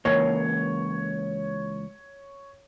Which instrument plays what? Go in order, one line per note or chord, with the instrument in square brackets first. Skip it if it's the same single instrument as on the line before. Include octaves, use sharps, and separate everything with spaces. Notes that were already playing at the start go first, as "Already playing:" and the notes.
[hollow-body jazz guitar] C#2 E3 A#3 [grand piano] C#5